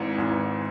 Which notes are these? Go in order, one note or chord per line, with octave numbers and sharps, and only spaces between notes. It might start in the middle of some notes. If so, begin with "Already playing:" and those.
Already playing: G#1 G#2 E3
G#1 G#2 E3